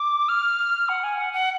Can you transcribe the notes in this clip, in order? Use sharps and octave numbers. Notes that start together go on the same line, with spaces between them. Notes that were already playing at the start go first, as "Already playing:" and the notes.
Already playing: D6
F6
F#5
G#5
F#5
F#5